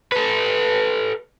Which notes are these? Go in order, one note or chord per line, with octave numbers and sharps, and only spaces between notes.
A4 B4